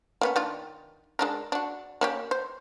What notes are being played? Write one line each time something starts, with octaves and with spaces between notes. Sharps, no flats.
A#3 B3 C#4
D#3 D4 F4
G#3 D4 A#4
D4 F#4
A#3 C#4 G4
C5